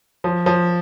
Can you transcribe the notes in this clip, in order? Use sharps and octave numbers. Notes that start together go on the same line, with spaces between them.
F3
F3